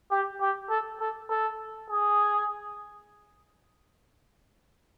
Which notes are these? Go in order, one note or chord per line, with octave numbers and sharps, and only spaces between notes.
G4
G4
A4
A4
A4
G#4